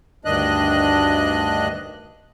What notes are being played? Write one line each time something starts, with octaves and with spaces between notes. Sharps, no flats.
D2 G2 D#3 D4 D#5 F#6